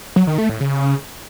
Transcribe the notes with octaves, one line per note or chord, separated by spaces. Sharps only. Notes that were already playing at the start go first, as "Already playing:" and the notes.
F#3
D#3
A3
A2
C#3